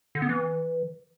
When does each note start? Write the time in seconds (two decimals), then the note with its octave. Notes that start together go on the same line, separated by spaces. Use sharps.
0.15 D3
0.22 B3
0.29 E3